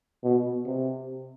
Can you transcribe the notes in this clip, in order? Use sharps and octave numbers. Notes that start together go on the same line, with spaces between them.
B2
C3